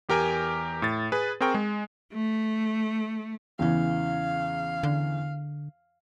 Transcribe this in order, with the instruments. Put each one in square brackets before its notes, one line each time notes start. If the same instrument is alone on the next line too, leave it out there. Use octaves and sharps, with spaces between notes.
[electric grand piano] E2 G4 A#4 G5 G#5
A2 A6
G#4 B4
C4 G#4 A#4 G5 C#6
G#3
[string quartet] A3
[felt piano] E2 C#3 E3 [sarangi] F5
[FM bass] D3